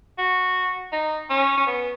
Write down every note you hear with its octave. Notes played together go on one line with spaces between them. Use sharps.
F#4
D#4
C#4
C#4
B3